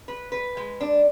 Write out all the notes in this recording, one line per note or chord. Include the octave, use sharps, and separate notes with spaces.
B4
B4
G#3
D4